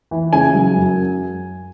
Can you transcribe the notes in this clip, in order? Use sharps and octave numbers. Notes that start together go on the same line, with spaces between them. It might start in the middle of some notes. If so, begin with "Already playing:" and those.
E3
C#3 G#5
F#3
F#2